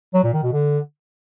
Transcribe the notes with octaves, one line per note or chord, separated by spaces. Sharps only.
F#3
A#2
D#3
B2
D3